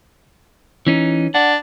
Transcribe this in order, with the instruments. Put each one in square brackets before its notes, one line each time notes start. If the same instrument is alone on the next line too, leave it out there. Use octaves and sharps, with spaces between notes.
[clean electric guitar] E3 C#4 D#4
[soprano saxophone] D4 [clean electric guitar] F#5